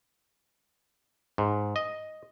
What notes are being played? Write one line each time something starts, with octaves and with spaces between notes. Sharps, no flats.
G#2
D#5